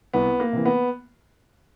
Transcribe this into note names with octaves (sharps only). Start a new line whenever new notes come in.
C2 B3
A#3
C3 E3
B3